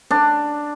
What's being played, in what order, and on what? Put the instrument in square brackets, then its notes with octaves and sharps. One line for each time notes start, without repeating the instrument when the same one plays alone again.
[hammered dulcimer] D4